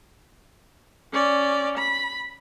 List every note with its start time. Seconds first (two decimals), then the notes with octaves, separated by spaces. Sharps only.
1.14 C#4 D5
1.78 B5